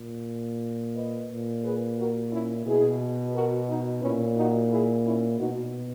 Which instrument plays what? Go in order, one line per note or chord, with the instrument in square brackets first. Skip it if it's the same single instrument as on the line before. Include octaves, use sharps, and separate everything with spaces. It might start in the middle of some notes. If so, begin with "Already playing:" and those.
Already playing: [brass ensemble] A#2
B4 D#5
A#2
G#4 B4
F#4 A#4
C#4 E4
B2 E4 G#4
F#4 A#4
D#4 F#4
A#2 C#4 E4
D#4 F#4
E4 G#4
C#4 E4
B2 D#4 F#4